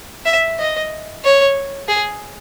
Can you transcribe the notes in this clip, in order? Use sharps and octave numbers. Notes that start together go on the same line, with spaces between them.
E5
D#5
C#5
G#4